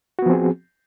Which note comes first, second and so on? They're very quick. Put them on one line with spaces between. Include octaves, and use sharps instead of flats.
F#4 B3 F3 C4 G#4